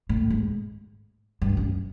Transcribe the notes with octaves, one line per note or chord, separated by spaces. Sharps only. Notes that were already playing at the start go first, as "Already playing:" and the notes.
A2
G#2
G2
F#2